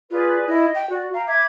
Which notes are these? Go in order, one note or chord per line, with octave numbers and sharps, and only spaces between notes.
F4 G#4 B4 D5
E4 D#5
G5
F#4 D5
F5 G5 A#5
E5 B5 D6 G#6